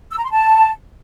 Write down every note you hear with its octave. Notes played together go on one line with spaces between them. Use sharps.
E6
A#5
C6
A5